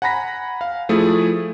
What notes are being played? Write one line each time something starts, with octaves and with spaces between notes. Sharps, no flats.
F#5 G#5 A#5 B5 A#6 B6
F5
F3 A3 E4 G#4